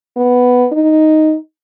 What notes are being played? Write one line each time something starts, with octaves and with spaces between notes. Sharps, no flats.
B3
D#4